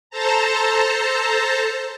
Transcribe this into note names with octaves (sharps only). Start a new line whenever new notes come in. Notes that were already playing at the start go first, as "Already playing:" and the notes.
A4 C5 A5 A#5